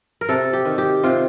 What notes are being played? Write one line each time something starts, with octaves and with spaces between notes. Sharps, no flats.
A#4
C3 A4
G4
D#3
G4
C3 F4